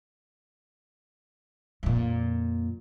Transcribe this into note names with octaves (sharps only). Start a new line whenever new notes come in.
F2 A#2